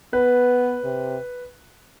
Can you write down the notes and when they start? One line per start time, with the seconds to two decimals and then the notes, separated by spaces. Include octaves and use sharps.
0.13 B3 B4
0.84 C3